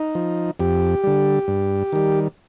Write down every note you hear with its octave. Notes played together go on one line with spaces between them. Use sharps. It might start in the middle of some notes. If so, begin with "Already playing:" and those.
Already playing: D#4
F3
F2 G4
D3 G3
G2
D#3 G3